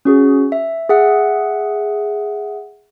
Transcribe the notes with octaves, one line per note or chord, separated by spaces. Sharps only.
C#4 F#4 G#4
E5
G#4 E5 F#5